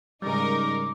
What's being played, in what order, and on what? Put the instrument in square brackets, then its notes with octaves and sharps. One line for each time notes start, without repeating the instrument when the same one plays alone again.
[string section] G#2 D#4 A#4 [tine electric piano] C#3 G3 [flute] D6